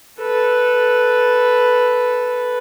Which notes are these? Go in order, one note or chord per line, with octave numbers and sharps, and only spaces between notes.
A4 B4